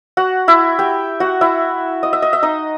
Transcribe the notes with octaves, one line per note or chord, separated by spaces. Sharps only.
F#4 F#5
E4 E5
G4 G5
F#4 F#5
E4 E5
D#5
E5
D#5
E5
D#4 D#5